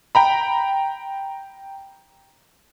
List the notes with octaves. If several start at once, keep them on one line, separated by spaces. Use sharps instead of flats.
G5 A#5 B5